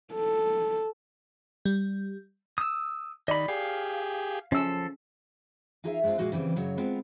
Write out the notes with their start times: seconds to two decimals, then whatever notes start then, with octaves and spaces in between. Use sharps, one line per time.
0.13 A4
1.65 G3
2.58 D#6 E6
3.28 D#3 D5 D#5 B5
3.48 G4 G#4 F5
4.52 F3 C#4 A4 E6
5.84 D#4 F4 G#4 A#4 D5 E5
6.04 G#3 B3 C4 D4 F4
6.18 A#2 G#3 F#4 D#5 F5
6.32 C#3 E3 G3 C4
6.56 F#2 C#3 F#3 C#5
6.77 G#3 B3 C4 F4 A#4